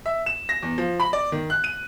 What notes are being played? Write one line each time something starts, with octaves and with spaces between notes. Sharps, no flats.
E5
E7
A#6
E2
F3
B5
D5
D#3
F#6
D#7